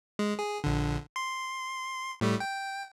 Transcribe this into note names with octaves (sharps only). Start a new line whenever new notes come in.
G#3
G#4
A#1 D3
C6
A2 G3 A3
G5